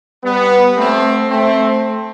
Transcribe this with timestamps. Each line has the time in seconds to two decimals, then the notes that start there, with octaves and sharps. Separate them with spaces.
0.23 G3 B3
0.77 A3 C4
1.30 A3 C4